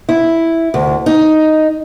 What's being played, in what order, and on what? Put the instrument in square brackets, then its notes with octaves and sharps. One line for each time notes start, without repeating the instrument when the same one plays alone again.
[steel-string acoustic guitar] E4
D2
D#4